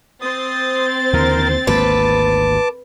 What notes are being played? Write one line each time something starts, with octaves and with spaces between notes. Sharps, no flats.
C4 C5 D#6 A6
D#2 D3 E3 A#4
G#1 D2 A#3 B4 A5 D6